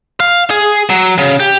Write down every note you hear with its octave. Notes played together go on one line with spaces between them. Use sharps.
F5
G#4
F#3
C#3
G4